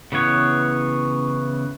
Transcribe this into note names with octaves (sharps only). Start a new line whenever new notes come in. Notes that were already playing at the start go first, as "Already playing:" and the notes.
C#3 E3 B3 C#5